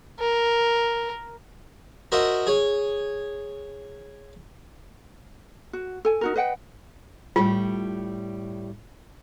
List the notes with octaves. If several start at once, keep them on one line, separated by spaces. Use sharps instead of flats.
A#4
F#4 A#4 C5 D#5 E5 F#5
G#4 C#5
F#4
A4 G#5
D#4 F#4 A#4
B4 D#5 F#5 G5
A2 G3 F4